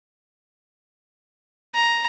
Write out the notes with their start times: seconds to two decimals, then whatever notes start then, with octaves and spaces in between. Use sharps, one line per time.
1.75 A#5